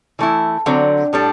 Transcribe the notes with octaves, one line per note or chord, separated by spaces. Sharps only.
E3 A3 E4
D3 F#3 C4
A2 G3 D4 A4